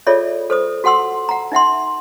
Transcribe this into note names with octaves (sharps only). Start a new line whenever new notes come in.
F4 G#4 A4 C#5 D5 E5
A4 C5 D#6
F#4 A4 F#5 C6 E6
F#5 A#5
D#4 E5 F#5 C6